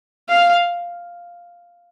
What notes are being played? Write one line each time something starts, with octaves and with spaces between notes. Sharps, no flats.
F5